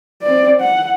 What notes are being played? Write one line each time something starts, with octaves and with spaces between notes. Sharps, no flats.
C4 D5
F#5